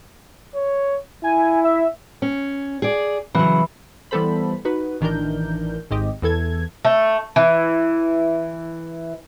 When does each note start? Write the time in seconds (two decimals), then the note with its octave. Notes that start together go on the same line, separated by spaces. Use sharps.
0.55 C#5
1.23 E4 G#5
1.64 E5
2.22 C#4
2.82 G#4 D5
3.35 C#3 E3 F#3
4.11 E3 G3 B3 A4 C5 B5
4.65 D#4 F#4 B4
5.01 A1 D#3 E3 D4 A#4 G6
5.91 G#1 G#2 C4 G4 D#5
6.22 E2 E3 A4 G#6
6.85 A3
7.36 E3